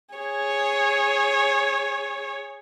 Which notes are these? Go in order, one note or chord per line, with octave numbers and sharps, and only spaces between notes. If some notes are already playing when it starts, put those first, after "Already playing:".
G#4 C#5